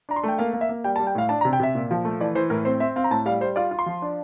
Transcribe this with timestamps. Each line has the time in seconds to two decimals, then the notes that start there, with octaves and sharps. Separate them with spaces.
0.09 D4 A#5
0.16 C6
0.23 A3 G5
0.38 A#3 F5
0.53 A#3
0.61 E5
0.69 A#3
0.84 G3 G5
0.96 A5
0.99 G3
1.07 G5
1.15 A2 F5
1.29 D4 A5
1.41 A#5
1.45 C3
1.53 G5
1.60 C3 E5
1.75 A#2
1.91 F3
2.05 A3
2.20 E3 D5
2.35 E3 C5
2.50 A2 A#4
2.65 C4 C5
2.80 C4 E5
2.96 C4 F5
3.04 A#5
3.11 A2 A5
3.26 G3 F5
3.41 G3 C5
3.56 F4 D5
3.71 F4
3.79 C6
3.86 F3
4.02 D4